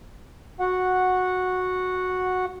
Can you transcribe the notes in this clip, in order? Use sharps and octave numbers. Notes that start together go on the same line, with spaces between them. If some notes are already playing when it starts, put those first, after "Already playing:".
F#4 F#5